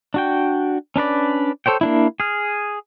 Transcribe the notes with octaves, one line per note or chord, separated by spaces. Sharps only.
D4 F#4 G5
C#4 D4 B4 D5
A4 C5 C#5 G5
A#3 D4 E4
G#4 F6